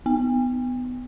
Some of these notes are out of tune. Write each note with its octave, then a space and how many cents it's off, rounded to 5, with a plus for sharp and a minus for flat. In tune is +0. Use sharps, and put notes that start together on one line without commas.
B3 +20